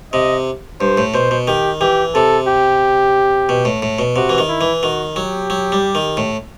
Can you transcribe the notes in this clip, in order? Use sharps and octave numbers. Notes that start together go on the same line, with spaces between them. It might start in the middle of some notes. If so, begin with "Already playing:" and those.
C3 D#5
G2 C5
A2
B2 C5
B2
D#3 G4
E3 G4
C3 A4
G4
B2
A2
A2
B2
C3 F#4
E3
D#3
E4
E3
D#3 F#4
F#3 G4
F#3
G3
D#3
A2